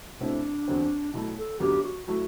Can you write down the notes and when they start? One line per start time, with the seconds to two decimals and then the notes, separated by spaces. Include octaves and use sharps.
0.20 B2 A3 C4 D4 E4
0.68 E2 D3 F#3 C4
1.13 B2 F#3 A3 E4
1.37 A4
1.60 F#2 D3 F#3 B3 G4
1.84 F#4
2.07 F#3 A3 E4 F#4